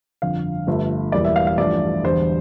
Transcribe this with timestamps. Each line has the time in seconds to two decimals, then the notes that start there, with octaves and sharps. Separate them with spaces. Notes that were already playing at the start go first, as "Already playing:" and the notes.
0.22 G1 F2 D3 F5
0.67 G1 G2 F3 A3
1.12 E1 E2 E3 G3 A#3 D5
1.24 E5
1.36 F5
1.47 F5
1.58 A1 G2 F3 A3 D5
2.04 E1 E2 D3 G3 C5